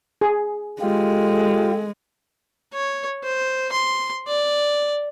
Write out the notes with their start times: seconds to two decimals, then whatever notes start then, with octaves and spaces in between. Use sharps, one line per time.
0.21 G#4
0.81 G#3 F4 G4 A4
2.73 C#5
3.24 C5
3.72 C6
4.27 D5